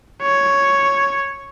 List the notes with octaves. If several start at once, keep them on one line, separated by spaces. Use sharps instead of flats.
C#5